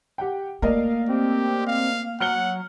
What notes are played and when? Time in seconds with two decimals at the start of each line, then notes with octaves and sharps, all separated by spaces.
0.18 G4 F#5 G5
0.62 A3 A#3 A#4 D5 D#5 F5
1.09 C4 G4
1.67 F5
2.20 F#3 F#5 F6 C#7 G7